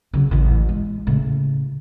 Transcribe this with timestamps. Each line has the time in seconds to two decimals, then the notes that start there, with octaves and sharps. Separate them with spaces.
0.14 C#3 F#3
0.31 A1 E3
0.69 G#3
1.07 A2 C#3